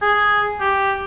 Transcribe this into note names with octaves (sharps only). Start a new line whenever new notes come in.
G#4
G4